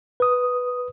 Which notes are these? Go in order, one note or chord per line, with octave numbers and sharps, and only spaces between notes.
B4 D#6